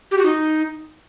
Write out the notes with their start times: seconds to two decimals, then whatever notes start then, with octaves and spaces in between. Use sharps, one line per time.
0.11 G4
0.18 F#4
0.26 D#4